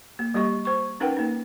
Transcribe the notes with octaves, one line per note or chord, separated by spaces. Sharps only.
A#3
G3 A#3 G4 D#5 C#6
C5 C#6
C#4 D#4 A#4 B4 F#5 G5
A#3 D#4